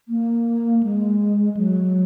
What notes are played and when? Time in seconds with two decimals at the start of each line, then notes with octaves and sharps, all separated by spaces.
0.09 A#3
0.83 G#3
1.57 F#3